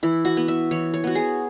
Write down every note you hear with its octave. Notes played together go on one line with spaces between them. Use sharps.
E3 E4
F#4
B3
E5
E3 C#5
C#5
B3 F#4
G#4